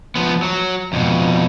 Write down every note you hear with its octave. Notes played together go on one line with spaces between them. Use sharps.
F3 B3
F#3
F2 B2